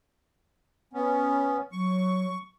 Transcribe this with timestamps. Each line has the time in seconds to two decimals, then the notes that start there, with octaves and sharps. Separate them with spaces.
0.93 B3 C#4
1.72 F#3 C#6